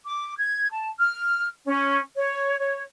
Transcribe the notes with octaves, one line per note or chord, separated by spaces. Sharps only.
D6
G#6
A5
F6
C#4
C#5
C#5